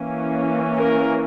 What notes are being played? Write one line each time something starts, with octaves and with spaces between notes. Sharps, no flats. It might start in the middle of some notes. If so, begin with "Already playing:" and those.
Already playing: E3 A#3 C#4
A#4